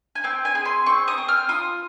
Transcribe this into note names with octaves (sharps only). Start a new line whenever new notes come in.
G#5
C4 G5
G#5
G#4
C6
C4 C#6
D#6
C4
F6
F4 D#6